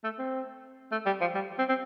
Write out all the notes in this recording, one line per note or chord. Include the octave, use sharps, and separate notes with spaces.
A3
C4
A3
G3
F3
G3
C4
C4